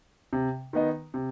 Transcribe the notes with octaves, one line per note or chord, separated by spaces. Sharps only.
C3
D#3 B3 D#4
C3